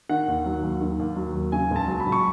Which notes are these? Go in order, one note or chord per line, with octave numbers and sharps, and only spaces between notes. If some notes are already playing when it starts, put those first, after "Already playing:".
D#3 F#5
D#2
F#3
D#2
D#3
D#2
F#3
D#2
C#3 G#5
C#2 A5
F#3
B5
C#2
C#6